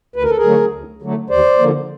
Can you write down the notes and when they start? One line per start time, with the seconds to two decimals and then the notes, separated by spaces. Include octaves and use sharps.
0.16 D2 B4
0.23 A#4
0.30 A4
0.37 G#4 A#4
0.44 D3 F#3 A3
0.73 D2
1.02 D3 F#3 A3
1.30 D#2 C5 D5
1.59 D3 F3 A#3